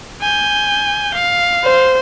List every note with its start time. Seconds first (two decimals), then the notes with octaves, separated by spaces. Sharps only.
0.21 G#5 G6
1.14 F5
1.64 C5